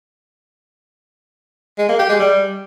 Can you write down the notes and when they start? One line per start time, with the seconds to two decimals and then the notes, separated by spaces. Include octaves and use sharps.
1.78 G#3
1.89 A#3
1.99 G4
2.09 G#3
2.19 G3